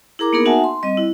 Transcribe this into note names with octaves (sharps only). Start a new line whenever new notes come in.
E4 G#4 A#4 A#5 D6
A#3 B3 D#4 G#4 A#4
D#4 F#4 E5 F#5 G#5 A5
C6
G3 C4 D#5
E4